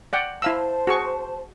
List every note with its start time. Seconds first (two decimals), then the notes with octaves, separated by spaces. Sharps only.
0.13 D5 F#5 G5
0.42 E4 C5 F5 A5 E6
0.87 F#4 G#4 C#6